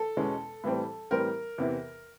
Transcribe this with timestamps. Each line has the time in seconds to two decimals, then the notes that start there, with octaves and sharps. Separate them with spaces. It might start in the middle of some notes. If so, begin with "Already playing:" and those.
Already playing: A4
0.17 E2 B2 G#3 C#4
0.64 A2 E3 G3 C4
1.11 A2 E3 G3 C4 A#4
1.58 E2 C3 E3